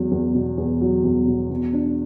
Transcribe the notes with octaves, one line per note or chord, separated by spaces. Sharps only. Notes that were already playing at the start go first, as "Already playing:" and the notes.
Already playing: E2 F#3
E2
B2
E2
F#3
E2
B2
B2
D4